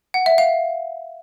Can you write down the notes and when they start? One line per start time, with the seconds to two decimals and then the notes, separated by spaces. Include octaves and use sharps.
0.14 F#5
0.26 E5
0.38 F5